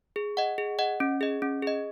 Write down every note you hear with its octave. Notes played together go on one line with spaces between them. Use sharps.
G#4
D#5 F#5
G#4
D#5 F#5
C#4
G#4 D#5
C#4
G#4 D#5